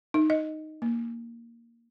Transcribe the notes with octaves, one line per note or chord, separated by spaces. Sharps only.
D#4
D#5
A#3